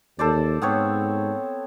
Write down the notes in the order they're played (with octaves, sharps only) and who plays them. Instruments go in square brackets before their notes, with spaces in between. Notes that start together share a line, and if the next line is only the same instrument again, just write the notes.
[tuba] D#2 [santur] A4 C5 D5
[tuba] G#2 [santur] B3 C4 C#5